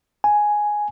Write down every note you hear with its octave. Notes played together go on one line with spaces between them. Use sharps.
G#5